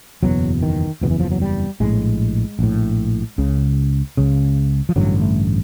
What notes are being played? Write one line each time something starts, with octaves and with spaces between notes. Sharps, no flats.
F#1 E2 B2 F#3
D#3
F#1 E2 B2
E3
F3
F#3
G3
A#1 A2 G#3
A#1 A2
C#2 C#3
C#2 C#3
F3
A1 G2 D3 F#3
A3